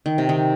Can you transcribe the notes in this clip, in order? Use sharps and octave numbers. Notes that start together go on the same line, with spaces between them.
D#3
C3
D#3